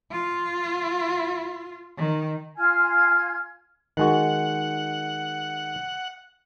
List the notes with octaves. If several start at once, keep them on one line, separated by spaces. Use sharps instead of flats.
F4
D#3
F4 G#5 F6 G#6
D#3 G#3 F#4 F#5